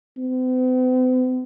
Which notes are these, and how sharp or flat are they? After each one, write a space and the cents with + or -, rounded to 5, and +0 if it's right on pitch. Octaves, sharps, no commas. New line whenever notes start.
C4 -45